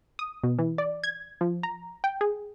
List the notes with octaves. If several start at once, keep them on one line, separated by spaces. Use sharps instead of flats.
D#6
B2
E3
D5
G#6
F3
A#5
G5
G#4